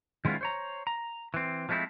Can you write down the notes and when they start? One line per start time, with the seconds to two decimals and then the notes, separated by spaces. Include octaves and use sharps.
0.25 D#3 G#3 B3 C#4 E4 F4
0.41 C5 C#5 A#5
0.87 A#5
1.34 E3 C4
1.69 F3 G#3 A3 C4 E4